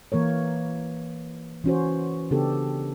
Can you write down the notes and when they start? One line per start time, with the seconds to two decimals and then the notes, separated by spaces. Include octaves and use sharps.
0.12 E3 A#3 A#4 C#5
1.64 E3 C#4 F#4 C5
2.31 C#3 B3 D4 G4 A4